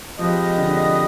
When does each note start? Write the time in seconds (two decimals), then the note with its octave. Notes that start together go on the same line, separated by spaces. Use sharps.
0.19 F3 G#3 C4 G4 B4 D#5
0.58 D3
0.76 D3